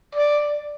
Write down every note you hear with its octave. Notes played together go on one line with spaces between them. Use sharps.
D5